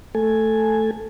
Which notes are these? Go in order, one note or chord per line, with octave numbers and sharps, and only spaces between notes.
A3 A4 G#5